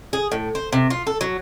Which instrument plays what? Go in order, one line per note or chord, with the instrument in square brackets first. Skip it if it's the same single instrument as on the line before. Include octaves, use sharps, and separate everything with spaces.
[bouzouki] G#4
A2
C5
C3
F4
A4
F#3